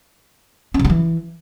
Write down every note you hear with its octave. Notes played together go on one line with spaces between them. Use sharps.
C#4
C#3
F#3
E3